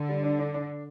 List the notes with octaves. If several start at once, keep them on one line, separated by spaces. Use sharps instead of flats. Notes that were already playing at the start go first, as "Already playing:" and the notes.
Already playing: D3
G3
D4
D4
D4